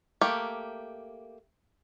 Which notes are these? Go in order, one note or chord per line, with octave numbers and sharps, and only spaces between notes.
A3 A#3 G4